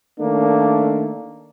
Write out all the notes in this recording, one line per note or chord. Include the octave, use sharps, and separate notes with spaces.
D#3 A3 A#3 D4